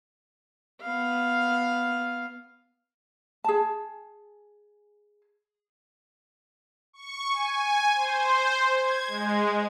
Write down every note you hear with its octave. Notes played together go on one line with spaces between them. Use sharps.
B3 F5
G#4 A5
C#6
G#5
C5
G#6
G#3